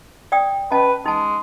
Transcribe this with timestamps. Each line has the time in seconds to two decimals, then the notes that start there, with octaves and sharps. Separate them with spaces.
0.32 D5 G5 D#6
0.72 C#4 B4 D#5 A5
1.06 G#3 D#4 A5